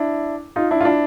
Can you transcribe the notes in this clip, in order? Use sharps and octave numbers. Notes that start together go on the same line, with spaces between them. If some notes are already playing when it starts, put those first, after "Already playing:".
Already playing: D4 E4
D#4 F4
D4 E4
F4
D4 E4